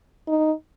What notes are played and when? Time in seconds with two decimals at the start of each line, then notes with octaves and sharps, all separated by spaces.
0.28 D#4